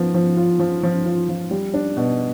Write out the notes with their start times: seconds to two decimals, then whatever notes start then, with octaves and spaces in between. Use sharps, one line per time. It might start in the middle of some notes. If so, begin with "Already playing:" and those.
Already playing: F3 B3
0.14 F3
0.37 F4
0.59 F3
0.83 F3
1.06 F4
1.29 F3
1.51 G3
1.74 D4
1.97 B2